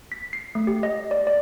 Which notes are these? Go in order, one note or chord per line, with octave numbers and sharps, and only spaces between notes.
B6
C7
A3
G4
D#5
D5
D5